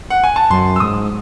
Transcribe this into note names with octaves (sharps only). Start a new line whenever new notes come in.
F#5
G#5
A5
F#2 C6
E6
G#2 D#6